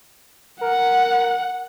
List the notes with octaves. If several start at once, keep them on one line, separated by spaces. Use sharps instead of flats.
A#4 F#5